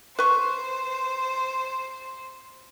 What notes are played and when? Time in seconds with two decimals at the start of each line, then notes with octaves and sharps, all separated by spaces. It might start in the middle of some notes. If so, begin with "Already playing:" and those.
0.19 B4 C5 C#6